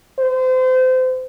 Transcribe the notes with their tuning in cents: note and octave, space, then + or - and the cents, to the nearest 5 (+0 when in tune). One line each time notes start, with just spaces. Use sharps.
C5 -30